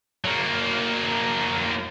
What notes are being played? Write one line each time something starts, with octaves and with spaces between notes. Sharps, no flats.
F#3 A#3